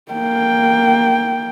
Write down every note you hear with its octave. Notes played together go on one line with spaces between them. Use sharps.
A#3 G5